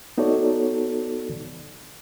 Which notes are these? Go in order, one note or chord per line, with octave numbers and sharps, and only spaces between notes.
B3 D#4 F#4 A4 C#5 D5